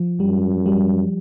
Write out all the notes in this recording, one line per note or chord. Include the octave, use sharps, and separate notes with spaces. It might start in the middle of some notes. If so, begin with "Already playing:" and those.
Already playing: F3
F#2 G3
G3